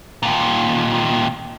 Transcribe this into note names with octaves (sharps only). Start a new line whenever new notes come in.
D#2 A#2